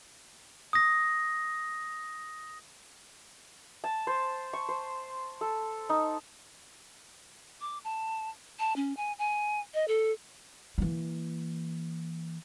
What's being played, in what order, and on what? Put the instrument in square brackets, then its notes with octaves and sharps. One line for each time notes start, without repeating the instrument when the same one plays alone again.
[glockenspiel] D#6 A#6
[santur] A5
C5
C#6
C5
A4
D#4
[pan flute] D6
A5
A5
C#4
G#5
G#5
D#5
A4
[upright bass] E3 A#3